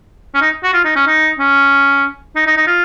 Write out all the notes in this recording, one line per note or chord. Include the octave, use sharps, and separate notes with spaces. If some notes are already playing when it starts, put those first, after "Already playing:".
C#4
D#4
F#4
F4
D#4
C#4
D#4
C#4
D#4
D#4
D#4
F4